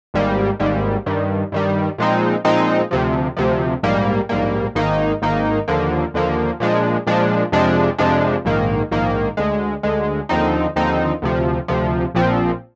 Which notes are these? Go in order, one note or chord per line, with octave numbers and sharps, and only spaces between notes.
G#1 G#2 G3 A#3
G#1 G#2 G3 A#3
G2 D#3 G3
G2 D#3 G3
A#2 F3 G#3 C4 D#4
A#2 F3 G#3 C4 D#4
D2 C3 F3
D2 C3 F3
A#1 G#2 G3 A#3
A#1 G#2 G3 A#3
G#1 G#2 D#3 A#3 D#4
G#1 G#2 D#3 A#3 D#4
D#2 D3 F3 A#3
D#2 D3 F3 A#3
A#2 F3 G#3 D4
A#2 F3 G#3 D4
F2 C3 F3 G#3 D4
F2 C3 F3 G#3 D4
A#1 G#2 D#3 A#3
A#1 G#2 D#3 A#3
D2 D3 G#3
D2 D3 G#3
D#2 D3 F3 C4 D#4
D#2 D3 F3 C4 D#4
D2 C3 F3
D2 C3 F3
A#1 A#2 F3 C4